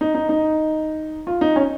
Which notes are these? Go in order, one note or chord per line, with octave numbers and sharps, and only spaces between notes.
D#4
D#4
D#4
F4
D#4
C#4